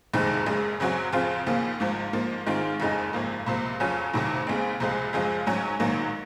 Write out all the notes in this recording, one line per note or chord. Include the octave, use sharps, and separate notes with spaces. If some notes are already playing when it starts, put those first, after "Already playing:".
F#1 F2 C3 D#3 G#3
F#1 F#2 C#3 G#3
F#2 C#3 F#3 C4 F#4
F2 C#3 F3 C4 F4
D#2 C#3 F3 A#3
G#1 G#2 F3
G#2 F3 A#3
G#2 D#3 G#3 C4 F4
F#1 F2 C#3 G#3 D#4
G#1 F#2 F3 A#3
C#2 C3 F3 A#3
F2 C#3 F#3 C#4 F4
F1 F2 C3 D#3 F#3
D#2 C#3 G#3 C4
C#2 C3 F3 G#3
F#2 C#3 F3 G#3
G#1 G#2 F#3 C#4
A#1 G#2 D#3 F#3 A#3